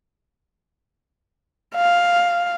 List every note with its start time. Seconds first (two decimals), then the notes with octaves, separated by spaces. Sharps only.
1.75 F5